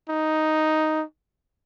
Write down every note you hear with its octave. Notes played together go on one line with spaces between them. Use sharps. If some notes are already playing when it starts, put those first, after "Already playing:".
D#4